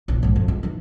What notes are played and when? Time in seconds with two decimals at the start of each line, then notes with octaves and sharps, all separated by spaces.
0.08 A#1 E3
0.23 A#1 G#2
0.36 F2
0.48 G#3
0.63 E3 D#4